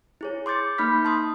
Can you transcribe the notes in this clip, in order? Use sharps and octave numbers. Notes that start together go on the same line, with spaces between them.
E4 G#4 C#5
C6 D6 G6 A6 C#7
A#3 D#4 B5 F6 G6 B6
A5 C6 D#6